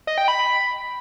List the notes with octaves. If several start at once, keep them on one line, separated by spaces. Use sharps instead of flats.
D#5
G5
B5